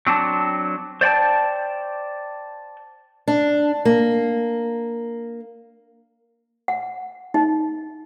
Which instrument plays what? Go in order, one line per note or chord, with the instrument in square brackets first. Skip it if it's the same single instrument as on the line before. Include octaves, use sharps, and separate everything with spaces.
[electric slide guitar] F#3 C4 D4 A5
C5 D5 G5 A5
[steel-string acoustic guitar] D4
A#3
[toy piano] F#5
D#4